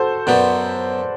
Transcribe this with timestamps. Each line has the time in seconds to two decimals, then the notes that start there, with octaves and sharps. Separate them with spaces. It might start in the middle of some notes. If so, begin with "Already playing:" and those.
Already playing: F#4 A4 C5
0.27 F#2 F#3 B3 B4 D5